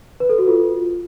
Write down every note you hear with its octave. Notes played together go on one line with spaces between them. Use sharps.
B4
A4
F#4
F4